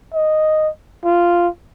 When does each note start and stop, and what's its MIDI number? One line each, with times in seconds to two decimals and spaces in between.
0.14 0.69 75
1.05 1.48 65